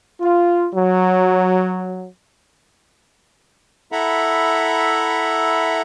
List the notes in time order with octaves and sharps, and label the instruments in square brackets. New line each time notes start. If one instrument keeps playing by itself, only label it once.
[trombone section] F4
F#3
[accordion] E4 A4 E5 F#5 A#5 B5